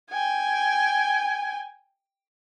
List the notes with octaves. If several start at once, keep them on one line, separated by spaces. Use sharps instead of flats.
G5 G#5